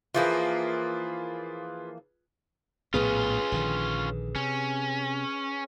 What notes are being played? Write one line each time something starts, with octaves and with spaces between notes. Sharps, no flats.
E3 F3 A#3 F4 G#4 B4
A#1 A2 B3 C#4 F4 G#4 B4
A#1 D3 D#3
C3 C#4